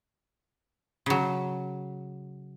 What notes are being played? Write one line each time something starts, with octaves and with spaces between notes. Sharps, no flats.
C#3 F#3